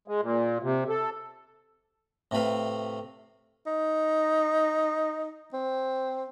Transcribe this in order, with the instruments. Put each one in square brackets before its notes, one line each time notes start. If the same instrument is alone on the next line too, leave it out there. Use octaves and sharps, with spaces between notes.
[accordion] G#3
A#2
C3
A4
[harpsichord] A2 C3 A3 B4 F5
[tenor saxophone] D#4
C4